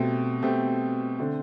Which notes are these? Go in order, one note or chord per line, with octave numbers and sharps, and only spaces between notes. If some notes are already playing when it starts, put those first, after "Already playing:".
Already playing: B2 A3 C4 G4
B2 A3 C4 G4
D3 A3 C4